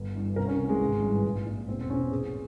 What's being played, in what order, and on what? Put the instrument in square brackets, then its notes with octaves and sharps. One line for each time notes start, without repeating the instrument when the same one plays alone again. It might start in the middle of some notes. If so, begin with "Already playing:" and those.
Already playing: [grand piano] G1
G2 E3
C2 A#4
C#4
C3 E3
G#3
G#1
G2 E3
A#1
A#2
E1 C4
C4
E2 C#4
C3
A#1 G#4